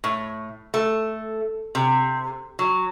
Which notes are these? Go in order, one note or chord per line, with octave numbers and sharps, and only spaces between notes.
A2
A3
C3
F#3